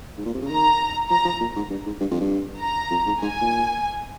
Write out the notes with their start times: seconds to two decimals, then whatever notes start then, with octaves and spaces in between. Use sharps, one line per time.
0.18 G#2
0.26 A#2
0.34 C3
0.42 C#3
0.50 D#3 A#5
1.10 F3 A#5
1.25 F3
1.40 A#2
1.56 G#2
1.70 G2
1.86 G#2
2.00 G2
2.11 F2
2.20 G2
2.61 A#5
2.91 F2
3.06 G#2
3.22 G#2 G#5
3.41 A#2